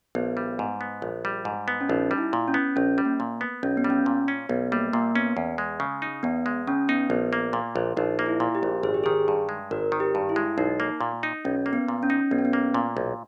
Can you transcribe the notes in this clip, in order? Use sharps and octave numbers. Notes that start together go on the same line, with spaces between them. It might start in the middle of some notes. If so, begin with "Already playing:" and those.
A#1 B3
G3
G#2
B3
A#1
G3
G#2
B3
C#4
A#1 D#4
G3
E4
A#2
C#4
B3
A#1 C#4
G3
A#3
A#2
B3
B1 C#4
B3
G3
C#4
A#2
C#4
B1 B3
G3 A#3
A#2 A#3
B3 C#4
E2
G#3
C#3
D#4
E2 B3
G#3
C#3 C#4
B3 D#4
A#1 B3
A#3
A#2
A#1
A#1 D#4
A#3
E4
A#2
G4
A#1
G#1 G#4
G4
D#3 G#4
G2
G#3
G#1 A#4
D#3
G4
G2
E4
G#3
B1 D#4
A#3
A#2
D#4
B1 C#4
A#3
B3
A#2
C#4
D#4
B1 B3
C#4
B3
A#3
A#2
B1